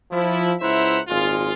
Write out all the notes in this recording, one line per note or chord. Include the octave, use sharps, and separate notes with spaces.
F3 E4
C#2 E4 C5 E5 F#5 A#5
G#1 A#2 G#3 F4